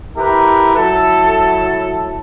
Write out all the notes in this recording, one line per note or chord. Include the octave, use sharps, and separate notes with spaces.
E4 G4 A#4 B4
F#3 E4 A4